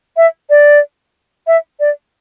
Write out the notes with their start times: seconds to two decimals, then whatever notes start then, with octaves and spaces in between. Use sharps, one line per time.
0.17 E5
0.50 D5
1.47 E5
1.80 D5